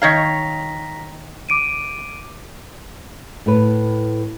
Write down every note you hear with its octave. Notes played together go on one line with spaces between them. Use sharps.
D#3 C#5 F5 A#5 A#6 B6
D6 D7 D#7
A2 B4